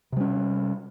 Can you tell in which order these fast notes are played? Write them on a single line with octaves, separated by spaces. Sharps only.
C3 G3 C#4